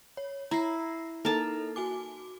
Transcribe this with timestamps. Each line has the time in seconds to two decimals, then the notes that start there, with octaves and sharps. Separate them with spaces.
0.17 C#5
0.51 E4 A#5 A#6 C7
1.25 A#3 D#4 A4 A#4 A5
1.76 F#4 G#5 D6